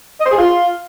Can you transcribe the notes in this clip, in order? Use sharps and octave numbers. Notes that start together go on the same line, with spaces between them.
D#5
C5
G#4
F4